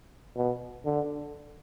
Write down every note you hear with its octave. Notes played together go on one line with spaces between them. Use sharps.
B2
D3